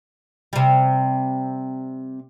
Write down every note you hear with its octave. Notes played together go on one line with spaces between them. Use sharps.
C3 G3